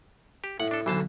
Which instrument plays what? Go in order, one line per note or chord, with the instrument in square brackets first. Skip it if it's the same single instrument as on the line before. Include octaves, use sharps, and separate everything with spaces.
[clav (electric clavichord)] G4
[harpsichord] A2 [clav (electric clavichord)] F#5
[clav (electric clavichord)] D4 A4
[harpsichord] B1 D3 [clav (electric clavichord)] E3 C5 A5